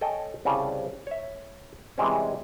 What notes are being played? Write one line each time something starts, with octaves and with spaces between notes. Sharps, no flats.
A4 C#5 D#5 G5 G#5
C2 C#3 G3 G#5 A5
C#5 E5
C3 E3 G3 G#3 C4 C#4